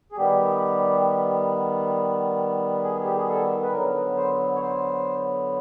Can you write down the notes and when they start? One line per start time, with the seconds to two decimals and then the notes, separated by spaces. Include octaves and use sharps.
0.12 G#4
0.17 D#3 G3 B3 G4
2.84 G#4
3.05 G4
3.17 G#4
3.29 A4
3.63 B4
3.72 D3 F#3 B3 A#4
4.17 C5
4.56 C#5
4.62 C5